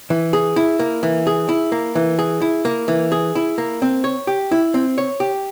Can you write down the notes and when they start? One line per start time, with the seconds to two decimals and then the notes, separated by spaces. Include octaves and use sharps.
0.10 E3
0.33 G#4
0.56 E4
0.79 A#3
1.03 E3
1.27 G#4
1.49 E4
1.72 A#3
1.95 E3
2.19 G#4
2.42 E4
2.65 A#3
2.88 E3
3.12 G#4
3.35 E4
3.58 A#3
3.82 C4
4.04 C#5
4.27 G4
4.52 E4
4.74 C4
4.98 C#5
5.20 G4